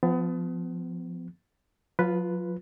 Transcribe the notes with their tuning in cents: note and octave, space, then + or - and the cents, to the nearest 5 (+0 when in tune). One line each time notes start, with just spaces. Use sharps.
F3 +0 B3 +35
F#3 -45 F4 -5 B4 +0